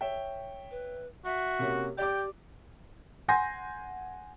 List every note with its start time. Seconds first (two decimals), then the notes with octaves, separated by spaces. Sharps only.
0.01 C#5 E5 G5
0.71 B4
1.25 F#4 E5
1.59 C3 A#3 C#4
1.98 G4 D5 G5 D6
3.28 F#5 G#5 C6 G6 A#6